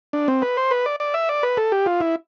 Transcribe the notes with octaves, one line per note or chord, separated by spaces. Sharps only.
D4
C4
B4
C5
B4
D5
D5
E5
D5
B4
A4
G4
F4
E4